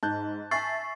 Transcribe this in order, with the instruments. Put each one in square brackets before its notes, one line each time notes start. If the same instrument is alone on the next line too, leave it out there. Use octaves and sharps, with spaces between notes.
[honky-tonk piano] G#2 [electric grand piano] A5 F#6 G6
[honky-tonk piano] E5 G#5 [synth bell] C#6 A6 C7